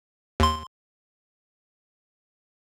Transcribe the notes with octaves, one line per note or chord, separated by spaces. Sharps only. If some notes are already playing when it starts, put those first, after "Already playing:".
D#2 C6